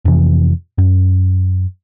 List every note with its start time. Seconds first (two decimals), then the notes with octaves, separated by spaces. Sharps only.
0.05 F2 C3 E3
0.78 F#2